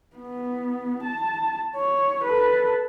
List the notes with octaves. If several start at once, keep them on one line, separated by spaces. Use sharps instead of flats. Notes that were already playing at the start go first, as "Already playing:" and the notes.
B3
A5
C#5
A4 B4